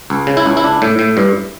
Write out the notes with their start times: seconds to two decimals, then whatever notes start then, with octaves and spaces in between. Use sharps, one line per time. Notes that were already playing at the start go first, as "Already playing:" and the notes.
0.10 C#2
0.27 C#3
0.37 E4
0.46 C#2
0.57 E4
0.64 D4
0.82 A2
0.99 A2
1.17 G2